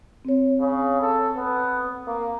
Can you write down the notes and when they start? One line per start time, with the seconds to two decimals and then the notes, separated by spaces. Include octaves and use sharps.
0.25 C4 C#5
0.59 C#3
1.01 A4
1.36 B3
2.07 A#3